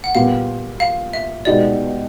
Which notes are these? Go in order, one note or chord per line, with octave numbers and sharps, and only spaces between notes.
F#5
A#2 G3 B3 F5
F5
E5
B2 G#3 B3 D#4 G4 D5